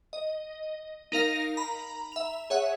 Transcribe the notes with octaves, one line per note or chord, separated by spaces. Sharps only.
D#5
D#4 A#4 F5 A#6
A#5 B5
E5 F7
G#4 C#5 E5 F#5